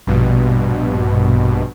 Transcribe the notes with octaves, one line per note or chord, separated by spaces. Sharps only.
A#1 G2 B2